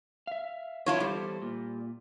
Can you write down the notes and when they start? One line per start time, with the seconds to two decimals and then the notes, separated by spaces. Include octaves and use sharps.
0.27 E5 F5
0.86 F#2 C3 E4 F4 C#5 A5
1.00 E2 G3 A4 C5
1.42 A#2